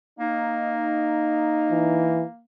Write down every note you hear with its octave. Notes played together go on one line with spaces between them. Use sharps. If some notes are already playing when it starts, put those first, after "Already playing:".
A#3 D#4
E3